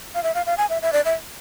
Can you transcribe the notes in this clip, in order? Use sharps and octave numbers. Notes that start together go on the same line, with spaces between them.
F5
E5
F5
F5
G#5
E5
E5
D5
E5